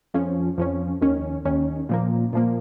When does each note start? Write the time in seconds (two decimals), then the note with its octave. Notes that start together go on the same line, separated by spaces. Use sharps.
0.14 F2 F3 C#4
0.58 F2 F3 C#4
1.01 D#2 D#3 C#4
1.45 D#2 D#3 C#4
1.89 A#2 F3 A#3
2.33 A#2 F3 A#3